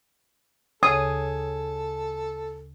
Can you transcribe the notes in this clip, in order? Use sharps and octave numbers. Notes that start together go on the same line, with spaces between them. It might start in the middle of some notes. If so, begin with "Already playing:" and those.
D2 C#3 G#4 A4 C#5 D#6